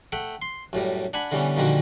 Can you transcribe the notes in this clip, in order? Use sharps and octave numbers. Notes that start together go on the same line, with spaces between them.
A3 E5 F#5 G5
C6
F#2 A2 G3
D4 F#5 G#5 B5
D3 E3 G3 B3 C#4
A#2 D3 D#3 F3 G3 F#4